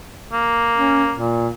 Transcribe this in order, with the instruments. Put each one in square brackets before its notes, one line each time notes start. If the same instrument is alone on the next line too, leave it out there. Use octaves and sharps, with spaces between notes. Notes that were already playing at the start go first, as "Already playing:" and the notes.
[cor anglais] A#3
[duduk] C#4
A#2